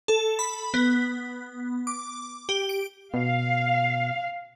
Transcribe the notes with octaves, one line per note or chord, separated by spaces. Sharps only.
A4
B5
B3
D6
G4
D7
B2 F5